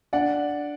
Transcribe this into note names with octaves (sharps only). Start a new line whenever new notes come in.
D4 D5 F#5